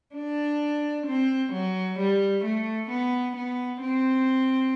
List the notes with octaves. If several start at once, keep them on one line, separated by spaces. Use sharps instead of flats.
D4
C4
F#3
G3
A3
B3
B3
C4